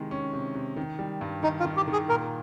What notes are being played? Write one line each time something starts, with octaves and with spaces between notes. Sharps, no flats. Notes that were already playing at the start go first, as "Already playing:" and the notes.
Already playing: C3 D#3 G#3
C#4
C3
C3
D#3
G3
G2
D#3 D#4
F4
D#3
G4
D#3
G#4
A#2 A#4